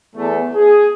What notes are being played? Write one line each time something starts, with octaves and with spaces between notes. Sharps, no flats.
E2 A3
G#4